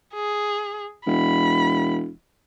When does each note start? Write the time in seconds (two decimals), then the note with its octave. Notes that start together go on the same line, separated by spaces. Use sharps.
0.14 G#4
1.07 E1 B5